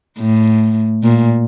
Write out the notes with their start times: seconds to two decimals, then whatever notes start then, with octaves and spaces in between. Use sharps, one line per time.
0.19 A2
1.04 A#2